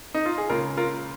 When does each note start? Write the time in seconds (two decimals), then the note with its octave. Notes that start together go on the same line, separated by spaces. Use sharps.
0.14 D#4
0.26 F4
0.38 G#4
0.49 C#2 C#3 A#3 F4 A#4
0.77 F4 A#4